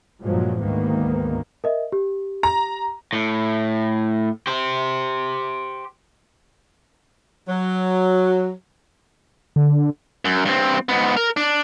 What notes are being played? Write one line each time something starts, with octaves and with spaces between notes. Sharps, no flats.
G2 A#2 F3 F#3 G#3
D2 G#2 D#3 A#3 B3
A#4 D#5 E5
G4
A#5
A2
G4 C5
F#3
D3
F#2
G2 C4
G#2 B3
A#4
D4